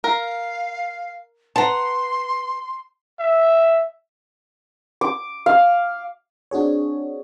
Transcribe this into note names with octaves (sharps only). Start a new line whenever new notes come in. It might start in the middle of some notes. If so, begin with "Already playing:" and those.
A#4 F5
B4 F#5 A5 A#5 C6
E5
D6
F5
C4 D4 F#4 G#4 C#5